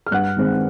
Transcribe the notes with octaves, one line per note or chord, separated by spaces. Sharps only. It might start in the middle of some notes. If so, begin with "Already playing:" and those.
F6
G2 F#5 F#6
D#3 G#3 C4